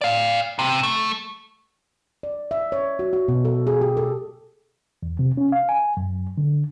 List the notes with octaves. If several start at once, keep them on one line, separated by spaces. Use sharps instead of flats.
D5 F5
C3
A3
D5
E5
C#5
F#4
F#4
B2
A4
G#4
G4
A4
E2
C3
C#4
F5
G#5
F#2
D3